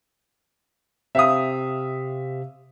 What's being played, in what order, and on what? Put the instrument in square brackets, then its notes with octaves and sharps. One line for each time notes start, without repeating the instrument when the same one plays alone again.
[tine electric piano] C3 C4 [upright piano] E5 F5 D#6